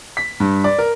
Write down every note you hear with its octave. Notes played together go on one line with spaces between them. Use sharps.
B6
G2
D5
A#4